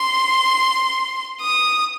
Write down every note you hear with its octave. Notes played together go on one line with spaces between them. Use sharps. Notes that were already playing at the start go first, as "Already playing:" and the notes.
Already playing: C6
D#6